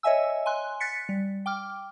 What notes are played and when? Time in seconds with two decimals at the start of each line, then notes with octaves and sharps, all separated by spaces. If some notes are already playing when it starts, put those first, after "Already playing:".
0.03 C#5 D#5 E5 G#5 E6
0.46 G#5 C6 F#6
0.80 F#6 A6 B6 C#7
1.09 G3
1.46 G5 D6 F6